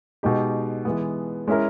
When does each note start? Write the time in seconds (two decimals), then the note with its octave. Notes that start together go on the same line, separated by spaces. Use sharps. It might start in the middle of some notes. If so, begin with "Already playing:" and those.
0.23 B2 G#3 D#4 G4
0.85 E3 G#3 B3
1.48 G#3 C#4 E4 A#4